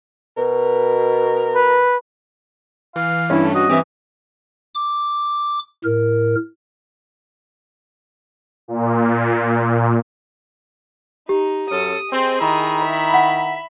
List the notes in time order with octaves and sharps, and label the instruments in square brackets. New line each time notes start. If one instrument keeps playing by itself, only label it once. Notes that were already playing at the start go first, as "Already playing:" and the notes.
[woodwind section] B2 [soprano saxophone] A#4
[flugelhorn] B4
[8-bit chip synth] E3 [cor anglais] F5
[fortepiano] G2 C#4 [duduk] E4
[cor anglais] A3
[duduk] F#4 [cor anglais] D#5
[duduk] E3 [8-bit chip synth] C4 G4 E5
[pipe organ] D6
A2 A#4
[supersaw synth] A#2
[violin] D#4 [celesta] G4
[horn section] F#2 C#4 A4 [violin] D#6
[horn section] C4 [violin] G#4 D#5
[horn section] D#3 E4 A#5
[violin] E5 B5
[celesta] F#5